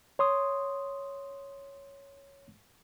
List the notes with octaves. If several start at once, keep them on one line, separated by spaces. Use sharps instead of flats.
C#5 C6 D#6